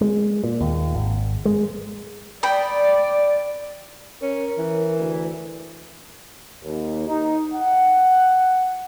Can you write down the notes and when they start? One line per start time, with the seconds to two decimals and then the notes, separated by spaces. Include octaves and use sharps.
0.01 G#3
0.44 A#2
0.61 D#2
0.95 G#1
1.45 G#3
2.43 D5 G5 B5 D#6
4.22 C#4 A#4
4.57 E3
4.99 D2
6.64 D#2
7.08 D#4
7.54 F#5